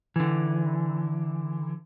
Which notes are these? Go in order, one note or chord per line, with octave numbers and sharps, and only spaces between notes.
D3 E3